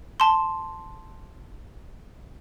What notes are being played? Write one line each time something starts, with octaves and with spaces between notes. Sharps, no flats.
A5 C6